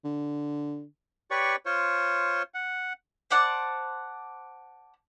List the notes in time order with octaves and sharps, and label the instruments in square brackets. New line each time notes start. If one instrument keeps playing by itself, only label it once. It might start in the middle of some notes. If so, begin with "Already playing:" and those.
[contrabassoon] D3
[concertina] G4 B4 C#5 D5 C#6
F4 C5 C#5
F#5
[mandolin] C5 D5 F#5 A5